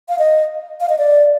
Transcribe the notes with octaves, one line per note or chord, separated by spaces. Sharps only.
F5
D#5
F5
D#5
D5